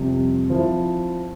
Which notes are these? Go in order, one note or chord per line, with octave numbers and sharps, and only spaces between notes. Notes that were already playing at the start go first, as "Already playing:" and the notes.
Already playing: F2 C3 G3
F3 C4 E4